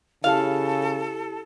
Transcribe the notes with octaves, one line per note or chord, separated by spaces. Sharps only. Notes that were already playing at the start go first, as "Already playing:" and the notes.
C#3 E4 G4 A4 F5 A5